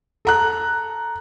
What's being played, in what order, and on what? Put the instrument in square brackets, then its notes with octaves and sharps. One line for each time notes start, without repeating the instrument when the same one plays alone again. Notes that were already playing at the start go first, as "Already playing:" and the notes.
[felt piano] A4 A#5 F#6